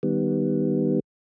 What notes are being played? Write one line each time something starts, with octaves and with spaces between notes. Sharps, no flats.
D#3 G3 B3